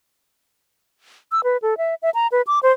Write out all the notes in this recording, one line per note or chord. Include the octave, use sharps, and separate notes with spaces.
E6
B4
A4
E5
E5
A#5
B4
D6
C5